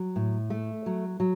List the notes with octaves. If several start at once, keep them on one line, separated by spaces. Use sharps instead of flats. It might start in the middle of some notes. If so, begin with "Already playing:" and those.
Already playing: F#3
A2
A3
F#3
F#3